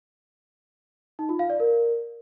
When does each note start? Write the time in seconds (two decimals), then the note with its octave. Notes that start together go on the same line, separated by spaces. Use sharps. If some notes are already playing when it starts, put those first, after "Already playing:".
1.19 D#4
1.29 F4
1.39 F5
1.50 D5
1.60 A#4